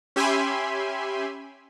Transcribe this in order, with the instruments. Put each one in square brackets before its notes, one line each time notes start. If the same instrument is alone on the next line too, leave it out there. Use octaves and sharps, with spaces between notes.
[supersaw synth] C#4 G4 E5 G#5 B5 C6